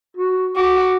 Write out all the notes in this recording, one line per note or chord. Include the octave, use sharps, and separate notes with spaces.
F#4
F#4 D6